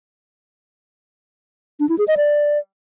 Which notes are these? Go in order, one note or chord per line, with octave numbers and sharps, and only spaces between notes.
D4
E4
G#4
D#5
D5